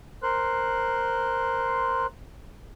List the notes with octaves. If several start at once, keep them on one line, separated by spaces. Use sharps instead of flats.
A#4 C5 C6 F#6